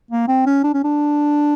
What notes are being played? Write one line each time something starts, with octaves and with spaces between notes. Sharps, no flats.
A#3
C4
C#4
D4
C#4
D4